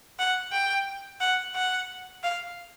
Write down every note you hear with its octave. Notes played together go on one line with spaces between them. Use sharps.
F#5
G5
F#5
F#5
F5